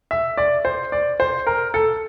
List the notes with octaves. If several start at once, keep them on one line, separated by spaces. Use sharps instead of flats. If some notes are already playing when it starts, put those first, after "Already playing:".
E5
D5
C5
D5
C5
A#4
A4